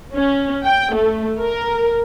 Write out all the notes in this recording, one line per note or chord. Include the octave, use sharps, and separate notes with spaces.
C#4
G5
A3
A#4